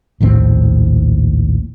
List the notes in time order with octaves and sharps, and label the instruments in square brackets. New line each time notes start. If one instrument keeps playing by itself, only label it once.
[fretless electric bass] A#1 D#2 A2 C4